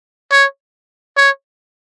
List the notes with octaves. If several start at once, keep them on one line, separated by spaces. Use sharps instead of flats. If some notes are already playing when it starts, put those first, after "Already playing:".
C#5
C#5